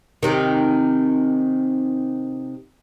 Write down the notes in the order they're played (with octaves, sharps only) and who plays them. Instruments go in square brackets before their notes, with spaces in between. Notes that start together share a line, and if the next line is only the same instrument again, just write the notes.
[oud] C3 D#3